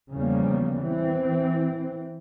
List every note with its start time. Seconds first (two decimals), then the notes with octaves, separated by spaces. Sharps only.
0.14 E2 C#3 F3 G3 A#3
0.79 E3 C4